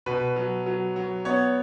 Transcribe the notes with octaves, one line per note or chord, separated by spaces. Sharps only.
B2 B4
F#3
F#3
F#3
B3 C#5